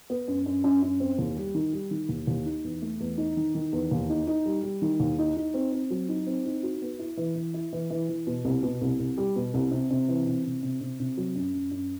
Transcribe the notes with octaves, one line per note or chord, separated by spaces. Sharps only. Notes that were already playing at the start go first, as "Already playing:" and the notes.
B3
F#2
F#2
F#2
F#2
C4
D#2
G3
D#3
G3
D#3
D#2
D#2
D#4
E2
A3
E2
D#4
D#3
D#3
E2
D#2
D#4
D#4
G3
G3
D#3
D#2
D#4
D#4
C4
C4
F#3
D#4
C4
D#4
F#4
B3
E4
E3
E3
E4
E3
E3
E3
B2
C2
B2
C2
C2
G3
B2
C2
C3
C3
E3
C3
C3
C3
C3
C3
F#3
F#2
F#2
F#2